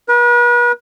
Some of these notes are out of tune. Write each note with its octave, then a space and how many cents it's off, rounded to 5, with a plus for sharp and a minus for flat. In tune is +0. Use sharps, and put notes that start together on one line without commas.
B4 -40